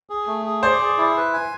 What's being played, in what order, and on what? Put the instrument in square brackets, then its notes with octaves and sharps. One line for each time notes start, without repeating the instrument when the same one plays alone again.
[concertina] G#4
A3
G#4
[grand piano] C5 [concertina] D5
[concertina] G#4
E4
B4
G#5